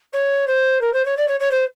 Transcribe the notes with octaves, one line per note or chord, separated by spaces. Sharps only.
C#5
C5
A#4
C5
C#5
D5
C#5
C#5
C5